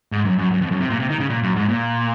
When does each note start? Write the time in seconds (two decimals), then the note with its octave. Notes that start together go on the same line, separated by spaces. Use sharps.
0.12 G#2
0.25 F#2
0.38 F#2
0.52 F#2
0.61 F2
0.71 F#2
0.81 C3
0.90 A#2
1.00 C3
1.10 D#3
1.20 C#3
1.30 A#2
1.43 F#2
1.56 G#2
1.68 A#2